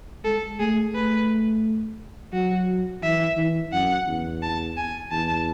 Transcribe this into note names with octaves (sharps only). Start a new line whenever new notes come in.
G#3 A4
A3 G#4
A3 B4
F#3 F#4
E3 E5
E3
F#2 F#5
E2
A5
G#5
E2 A5